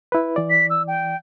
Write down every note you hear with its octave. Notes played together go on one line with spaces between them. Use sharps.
E4 B4
E3 D5
B6
E6
G5